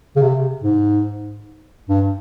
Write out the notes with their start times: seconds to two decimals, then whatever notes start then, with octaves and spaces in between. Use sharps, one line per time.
0.16 C#3
0.22 C3
0.64 G#2
1.89 G2